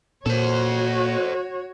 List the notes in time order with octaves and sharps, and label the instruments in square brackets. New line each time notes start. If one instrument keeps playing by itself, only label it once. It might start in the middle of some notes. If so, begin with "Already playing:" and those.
[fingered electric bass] A#2 [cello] F#4 C#5 [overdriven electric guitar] A4 C5